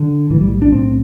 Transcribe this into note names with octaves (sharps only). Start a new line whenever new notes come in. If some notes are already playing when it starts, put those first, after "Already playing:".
Already playing: D3
B1 A2 E3
G3
D4
B1 A2 C4